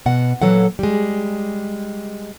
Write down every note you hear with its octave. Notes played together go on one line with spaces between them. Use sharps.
B2 F#5
A#2 E3 F#3 A4 F#5
G3 G#3